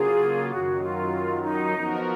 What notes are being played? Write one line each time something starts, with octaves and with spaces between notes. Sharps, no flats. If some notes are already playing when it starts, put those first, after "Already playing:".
Already playing: C#3 F#3 A#3 F4 G#4
F#2 D#3 F#3 F#4
F4
D#4
F3 B3 F#4 A#4